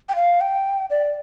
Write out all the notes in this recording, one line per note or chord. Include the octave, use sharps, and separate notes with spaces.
G5
F5
G5
D5